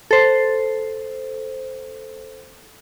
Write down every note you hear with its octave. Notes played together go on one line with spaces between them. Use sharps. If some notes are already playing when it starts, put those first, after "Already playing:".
A4 C5